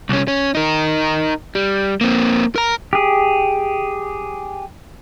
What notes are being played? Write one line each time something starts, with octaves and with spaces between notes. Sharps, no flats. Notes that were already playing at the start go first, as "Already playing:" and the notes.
C2 C#4
C#4
D#4 A#4
G3
A#3 C4
A#4 A#5
G4 G#4